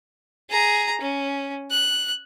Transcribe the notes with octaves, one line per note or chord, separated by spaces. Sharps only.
G#4 A#5
C#4
F#6